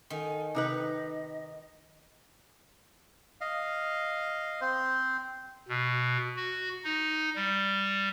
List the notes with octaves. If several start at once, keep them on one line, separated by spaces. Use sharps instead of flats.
D#3 A4 F#5 G#5
C3 D#4 B4 D#5
D#5 F5
C4 C5
B2
F#4
D#4
G3